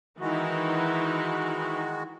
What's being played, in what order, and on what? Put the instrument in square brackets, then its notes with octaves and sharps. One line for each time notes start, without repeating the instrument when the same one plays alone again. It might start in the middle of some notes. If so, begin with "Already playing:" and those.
[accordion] D#3 G#3 F#4 [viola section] E3 D#4 E4